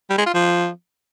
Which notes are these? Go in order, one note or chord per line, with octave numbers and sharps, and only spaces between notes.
G3
G#3
F4
F3